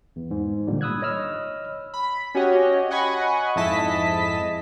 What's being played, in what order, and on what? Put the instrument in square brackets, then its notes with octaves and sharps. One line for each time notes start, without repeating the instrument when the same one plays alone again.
[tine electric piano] E2
G#2
A1 A#2 D3 G3
B5 D#6 E6 F#6 G#6
C#5 D#5 B5 E6 F6
[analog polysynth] B5
C#4 F#4 G4 C#5 D#5
D#5 F#5 G#5 B5 C#6
F2 G#2 E4 D#5 A5 B6